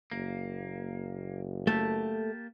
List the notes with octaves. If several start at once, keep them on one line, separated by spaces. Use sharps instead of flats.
F#1 A#3
A3 A#3 G4 A4 A5